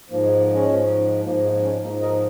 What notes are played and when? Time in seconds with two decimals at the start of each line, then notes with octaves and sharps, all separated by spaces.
0.10 G#2 F3 A#3
0.24 G#3
0.39 A#3
0.52 G#3 C#4
0.68 G#2 F3
1.25 G#2 F3 A#3
1.44 G#3
1.63 G#3 C#4
1.82 G#2 A#3 D#4
1.86 F3
2.01 A#4 D#5